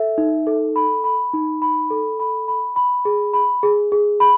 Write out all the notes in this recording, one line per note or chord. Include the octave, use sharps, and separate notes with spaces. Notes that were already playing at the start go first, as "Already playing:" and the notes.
Already playing: A4 E5
D#4
A4
B5
B5
D#4
B5
A4
B5
B5
B5
G#4
B5
G#4
G#4
B5